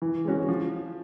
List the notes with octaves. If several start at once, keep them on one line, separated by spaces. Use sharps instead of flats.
E3
G#3 C#4 F#4
F3